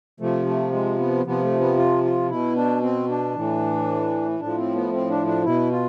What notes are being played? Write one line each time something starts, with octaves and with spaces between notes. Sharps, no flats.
C3 F3 A3
A3
G#3
B3
C3 F3 B3
A3
B3
F4
F4
B2 E4
D4
C4
D4
A2 E3
A2 F3 D4
C4
B3
C4
D4
D4
B2 E4
F4